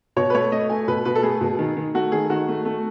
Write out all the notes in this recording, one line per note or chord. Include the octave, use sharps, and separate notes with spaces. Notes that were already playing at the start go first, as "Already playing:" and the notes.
B2 C#5
B4
A3 C#5
A3 D#5
A3 G#5
B2 B4
B2 B4
A4
A3 G#4
B2
D#3
D#3
A3 F#4
D#3 G#4
D#3 F#4
A3
A3